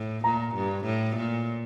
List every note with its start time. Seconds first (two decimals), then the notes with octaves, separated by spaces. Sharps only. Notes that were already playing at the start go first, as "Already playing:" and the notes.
Already playing: A2
0.24 A#2 A#5
0.55 G2
0.85 A2
1.16 A#2